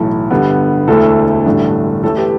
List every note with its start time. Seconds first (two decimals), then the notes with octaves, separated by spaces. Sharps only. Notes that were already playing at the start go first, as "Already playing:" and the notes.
Already playing: B1 A2 E3 A3 E4 A4
0.31 G1 G2 D3 G3 B3
0.88 E1 D2 D3 A3 E4 A4
1.46 A1 G2 D3 A3
2.03 A1 A2 A3 E4 A4
2.17 G4 B4